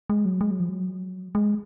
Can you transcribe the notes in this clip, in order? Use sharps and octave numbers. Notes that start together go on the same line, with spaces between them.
G#3
F#3
G#3
F#3
F3
F#3
G#3